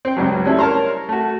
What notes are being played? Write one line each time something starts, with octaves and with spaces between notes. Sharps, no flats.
C4 G5
C#2 G2 F#3
G3 A3 C4 C#4 E4
A#4 C#5 A5 A#5 C6
A3 F#4